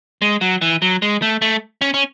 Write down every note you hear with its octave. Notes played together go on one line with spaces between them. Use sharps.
G#3
F#3
E3
F#3
G#3
A3
A3
C#4
C#4